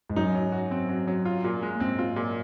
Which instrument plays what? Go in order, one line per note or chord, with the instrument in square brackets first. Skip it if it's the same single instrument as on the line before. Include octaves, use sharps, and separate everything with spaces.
[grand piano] G#2
[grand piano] F#2 [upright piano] D#4
[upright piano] F#3
F#4
C4
F#3
F#3
F4
A#2
G#3
[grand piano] A#2
[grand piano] G#2 [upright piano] C4
[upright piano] F4
A#2